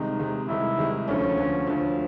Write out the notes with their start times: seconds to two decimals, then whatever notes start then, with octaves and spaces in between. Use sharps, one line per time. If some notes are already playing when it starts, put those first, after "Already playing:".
Already playing: C2 C3 D#3 G#3 D#4
0.19 C2 C3 D#3 G#3
0.49 C2 C3 D#3 G#3 E4
0.78 C2 C3 D#3 G#3
1.08 D2 D3 F3 C#4
1.38 D2 D3 F3
1.67 D2 D3 F3